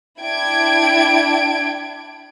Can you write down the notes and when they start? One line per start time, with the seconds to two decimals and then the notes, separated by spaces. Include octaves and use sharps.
0.21 D4 E4 G5 G#6 D7